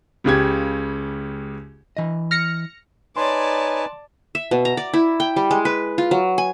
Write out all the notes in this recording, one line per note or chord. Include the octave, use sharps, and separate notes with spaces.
C#2 C#3 G4 G#6
E3 D#5
F6 A#6 C#7
D#4 B4 C#5 D5 G#5 A5 C6
E5
B2
A#5
D5
E4
G5
G3
G#3
B4
F4
F#3
G#5